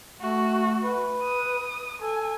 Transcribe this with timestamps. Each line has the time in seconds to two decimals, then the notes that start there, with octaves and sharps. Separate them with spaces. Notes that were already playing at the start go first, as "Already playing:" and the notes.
0.21 A3 F#4
0.83 B4
1.23 D#6
2.02 A4 G#5